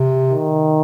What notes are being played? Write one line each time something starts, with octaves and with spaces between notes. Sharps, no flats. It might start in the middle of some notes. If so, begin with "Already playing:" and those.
Already playing: C3
D#3